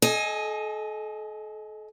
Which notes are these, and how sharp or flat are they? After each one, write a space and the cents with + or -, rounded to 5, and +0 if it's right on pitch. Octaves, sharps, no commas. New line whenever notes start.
A4 -35 D#5 +5 G#5 +0